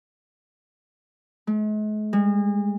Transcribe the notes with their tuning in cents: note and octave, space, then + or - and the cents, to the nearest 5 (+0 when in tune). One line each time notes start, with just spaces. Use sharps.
G#3 +45
G#3 -40